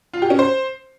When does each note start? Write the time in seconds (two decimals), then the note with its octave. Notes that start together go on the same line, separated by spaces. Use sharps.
0.14 F4
0.22 G4
0.30 C#4
0.39 C5